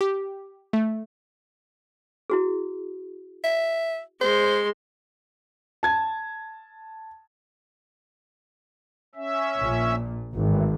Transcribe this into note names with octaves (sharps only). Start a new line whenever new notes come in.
G4
A3
E4 F#4 G#4
E5
G#3 C5 C6
A5 G#6
C#4 E5
A#1 A#2
G#1 A2 E3